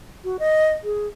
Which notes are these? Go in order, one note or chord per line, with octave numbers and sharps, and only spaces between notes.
F#4
D#5
G#4